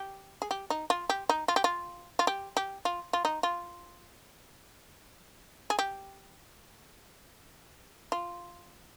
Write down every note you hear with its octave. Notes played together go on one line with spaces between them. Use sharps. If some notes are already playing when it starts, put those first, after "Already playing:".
Already playing: G4
G#4
G4
D#4
F4
G4
D#4
F4
G4
F4
F4
G4
G4
F4
F4
D#4
F4
G#4
G4
F4